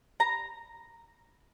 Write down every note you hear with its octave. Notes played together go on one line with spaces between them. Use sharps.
A#5